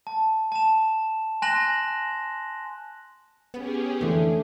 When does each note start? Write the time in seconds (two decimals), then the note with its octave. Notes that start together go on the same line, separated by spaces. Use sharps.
0.07 A5
0.52 A5 E7
1.42 G#5 C6 F#6 A#6 E7 F#7
3.54 B3 C#4 G4 G#4
4.01 F2 D3 E3 A3